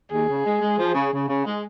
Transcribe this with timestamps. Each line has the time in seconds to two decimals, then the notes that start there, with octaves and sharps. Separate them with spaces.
0.11 D#2 G#4
0.28 C#3
0.44 G#3
0.61 G#3
0.78 F3
0.95 C#3
1.12 C#3
1.28 C#3
1.46 G#3